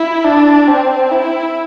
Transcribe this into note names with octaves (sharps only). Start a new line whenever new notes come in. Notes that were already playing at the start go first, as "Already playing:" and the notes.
Already playing: E4
D4
C4
E4